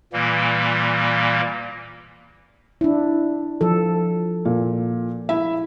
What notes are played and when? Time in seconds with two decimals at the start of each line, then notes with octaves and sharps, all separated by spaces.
0.13 A#2 E3 G3 A#3
2.81 D4 E4
3.61 F3 A4
4.45 A#2
5.29 E4 E5